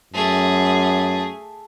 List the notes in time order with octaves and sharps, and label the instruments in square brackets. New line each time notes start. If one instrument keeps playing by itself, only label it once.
[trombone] F#2 [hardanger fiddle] A3 G#4